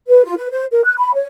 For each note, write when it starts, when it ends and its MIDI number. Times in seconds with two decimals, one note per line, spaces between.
0.08 0.24 71
0.25 0.34 65
0.37 0.48 71
0.51 0.65 72
0.72 0.83 70
0.85 0.94 90
0.98 1.14 83
1.14 1.27 73